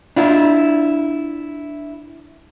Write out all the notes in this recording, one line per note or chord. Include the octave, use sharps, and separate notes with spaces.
D4 E4 F4